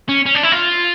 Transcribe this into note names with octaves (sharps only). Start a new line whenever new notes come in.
C#4
C#4
D4
E4
F4